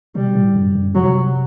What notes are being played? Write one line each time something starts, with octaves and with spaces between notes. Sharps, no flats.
B2 G3
A2
F#2
F#2
C3 F#3